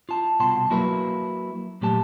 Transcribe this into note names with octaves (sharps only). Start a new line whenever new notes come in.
F4 A5
C2 B2 F#5 A5 C6
F#3 A#3 E4 F#4 A#4 B4
A#2 F#3 A3 G4 A5